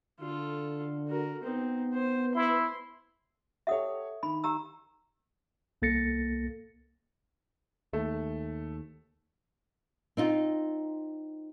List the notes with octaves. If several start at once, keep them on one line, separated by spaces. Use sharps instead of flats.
D3 F4 A4
F#4 A#4
B3 C4 D#4
C5
E4 C6
G4 A4 C#5 E5 F#5 D#6
D#3 B5
G4 A#5 E6
C2 A#3 A4 A6 A#6 C#7
D#2 A3
C4 D#4 F4